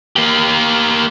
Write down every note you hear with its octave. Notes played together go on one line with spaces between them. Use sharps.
A#3 G4